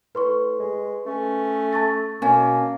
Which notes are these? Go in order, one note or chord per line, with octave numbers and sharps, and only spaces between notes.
A2 B4 C6 C#6
G#3
A3 C#4
A5 C#6 A6
B2 A#3 C#4